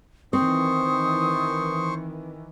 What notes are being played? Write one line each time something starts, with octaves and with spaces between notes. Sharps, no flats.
D#3 E3 C4 C5 C#6 D#6